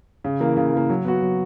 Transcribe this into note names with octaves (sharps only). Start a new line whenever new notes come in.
C#3
E3 A#3
C#3
E3 A#3
F#3
B3 F#4
F#3